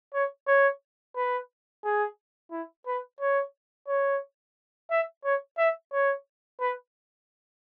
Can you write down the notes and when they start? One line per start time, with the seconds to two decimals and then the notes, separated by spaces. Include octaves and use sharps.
0.14 C#5
0.47 C#5
1.16 B4
1.84 G#4
2.51 E4
2.87 B4
3.21 C#5
3.88 C#5
4.90 E5
5.25 C#5
5.58 E5
5.93 C#5
6.61 B4